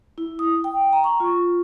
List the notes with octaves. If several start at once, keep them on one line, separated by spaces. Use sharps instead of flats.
E4
D#6
G5
A#5
C#6
F4